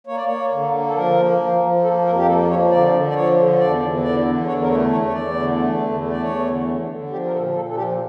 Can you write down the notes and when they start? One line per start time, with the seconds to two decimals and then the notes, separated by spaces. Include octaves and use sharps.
0.07 A#3 C#5
0.16 D5
0.25 A#3 C#5
0.51 D3
0.73 A#3
0.87 A4
0.95 F3 A#4
1.17 A#3
1.39 F3
1.61 F3
1.82 A#3 A4
2.05 F2 A#4
2.16 G4
2.27 A#3 A4
2.49 F3 C#5
2.71 D3 D5
2.92 D3
3.08 D5
3.14 F3 C#5
3.37 D3
3.59 E2 D5
3.81 E2
4.02 D3 D5
4.24 D3
4.47 E2 C#5
4.62 A#4
4.69 A3 C#5
4.90 E2 C#5
5.06 C#5
5.12 E2 D5
5.35 D3
5.56 A3
5.78 E2
6.00 A3
6.11 D5
6.22 E2 C#5
6.44 D3
6.66 D3
6.88 D3
7.10 F3 G4
7.25 A#4
7.32 A#2 A4
7.54 A#2 A4
7.69 A4
7.76 F3 G4